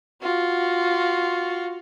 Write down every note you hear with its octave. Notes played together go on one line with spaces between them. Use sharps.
F4 F#4